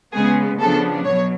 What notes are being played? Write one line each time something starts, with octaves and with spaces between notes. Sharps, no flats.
C#3 G#3 B3 G#4
C#3 F3 B3 D4 A4
B2 F#3 C#5